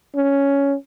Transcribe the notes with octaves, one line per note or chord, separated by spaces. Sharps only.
C#4